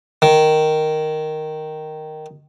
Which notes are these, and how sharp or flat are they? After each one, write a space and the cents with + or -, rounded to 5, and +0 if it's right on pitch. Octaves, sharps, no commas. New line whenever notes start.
D#3 -5